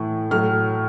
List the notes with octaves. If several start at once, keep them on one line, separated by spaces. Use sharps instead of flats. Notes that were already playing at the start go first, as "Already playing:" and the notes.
Already playing: A2 E3 A3
A2 F#3 A3 F6